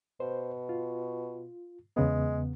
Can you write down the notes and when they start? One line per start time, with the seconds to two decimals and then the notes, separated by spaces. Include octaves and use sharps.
0.20 B2 C5
0.69 F4
1.97 E2 C#3 G#3 B3